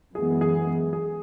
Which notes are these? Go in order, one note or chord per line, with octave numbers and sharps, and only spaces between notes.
F#2 E3 G#3 B3 G#4
G#4
G#4